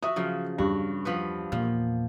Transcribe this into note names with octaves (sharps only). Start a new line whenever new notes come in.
F#4 E5 D#6
C#3 F3 F#3
E2 G2 F#4
F3 B3 B4
E2 A#2 F3